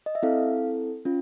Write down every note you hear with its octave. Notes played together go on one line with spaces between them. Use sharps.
D#5
E5
C4 E4 A4 F5
C#4 F4